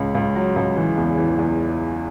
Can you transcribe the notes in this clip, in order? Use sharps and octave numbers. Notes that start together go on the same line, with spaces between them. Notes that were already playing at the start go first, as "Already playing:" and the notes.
Already playing: C#2 C#5
C#2
F#3
C#2
E3
E2
E3
E2